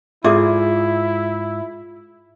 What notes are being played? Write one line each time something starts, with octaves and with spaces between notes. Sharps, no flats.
G#2 E4 F4 G#4 D5 E5 D6